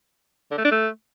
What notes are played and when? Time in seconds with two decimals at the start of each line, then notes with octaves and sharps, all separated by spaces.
0.51 D3
0.58 A3
0.65 D4
0.71 A3